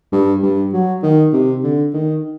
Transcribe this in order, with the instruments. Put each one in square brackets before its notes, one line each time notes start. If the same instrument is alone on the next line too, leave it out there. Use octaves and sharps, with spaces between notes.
[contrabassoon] G2
G2
F#3
D#3
C3
D3
D#3